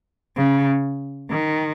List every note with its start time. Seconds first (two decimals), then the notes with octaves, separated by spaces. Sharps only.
0.37 C#3
1.31 D#3